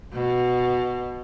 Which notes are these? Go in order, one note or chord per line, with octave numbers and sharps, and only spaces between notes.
B2